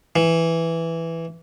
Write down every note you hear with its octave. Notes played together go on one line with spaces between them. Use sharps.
E3